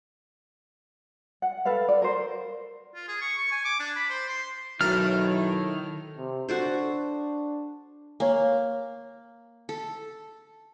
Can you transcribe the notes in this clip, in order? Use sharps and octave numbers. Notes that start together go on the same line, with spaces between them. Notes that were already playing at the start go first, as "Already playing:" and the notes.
F#5
A4 B4 F5
D5
A#4 C5
F4
G#4
C#6
C#6
G#5
D6
D4
B5
C5
C6
B1 D#3 E4 A4 A#4 C#5 A5 F6
C3
D4 F#4 A4 C5
A#3 C#5 G#5
A4